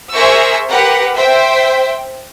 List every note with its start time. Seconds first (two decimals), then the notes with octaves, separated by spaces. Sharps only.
0.12 G#4 A#4 C5 E5 C#6 E6
0.69 G4 A#4 B4 F#5
1.17 C5 E5 G5